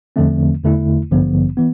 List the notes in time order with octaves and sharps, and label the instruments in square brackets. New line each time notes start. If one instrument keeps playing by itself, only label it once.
[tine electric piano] E2 D3 F3 A3 C4
E2 D3 A3 E4
A1 G2 D3 F3 B3
E3 B3